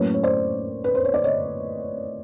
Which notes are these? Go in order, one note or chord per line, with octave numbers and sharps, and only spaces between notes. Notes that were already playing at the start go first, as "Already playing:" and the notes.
Already playing: A2 F#3 A#3 C#4 B4 C#5
C#5
C5 D5
B4
C5
C#5
D5
C#5 D#5